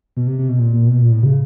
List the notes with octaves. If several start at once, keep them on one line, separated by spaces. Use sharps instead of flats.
B2
C3
C3
B2
A#2
A#2
B2
A#2
A2
C#3